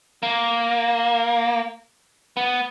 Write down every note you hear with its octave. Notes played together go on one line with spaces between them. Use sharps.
A#3
B3